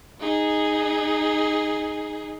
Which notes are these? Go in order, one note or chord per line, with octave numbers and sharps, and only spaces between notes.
D#4 G#4